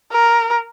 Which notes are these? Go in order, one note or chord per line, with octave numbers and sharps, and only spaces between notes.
A#4